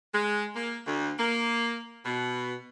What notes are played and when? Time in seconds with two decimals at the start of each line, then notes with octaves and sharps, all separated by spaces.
0.14 G#3
0.56 A#3
0.87 D2
1.19 A#3
2.06 B2